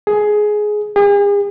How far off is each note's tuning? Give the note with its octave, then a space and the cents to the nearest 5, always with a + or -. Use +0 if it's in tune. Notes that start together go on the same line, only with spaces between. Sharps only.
G#4 +15
G#4 -40